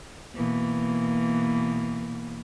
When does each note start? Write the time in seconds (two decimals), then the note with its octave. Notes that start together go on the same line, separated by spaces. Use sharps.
0.34 B2 E3 A#3